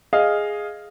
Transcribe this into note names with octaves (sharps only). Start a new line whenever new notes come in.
G#4 D#5 F5